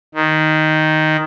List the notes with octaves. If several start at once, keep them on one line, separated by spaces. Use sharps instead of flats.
D#3